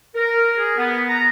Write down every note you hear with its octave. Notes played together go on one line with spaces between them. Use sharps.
A#4
G#4
B3
A#5